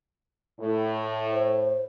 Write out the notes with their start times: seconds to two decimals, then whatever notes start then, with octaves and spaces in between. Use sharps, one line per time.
0.60 A2
1.32 C5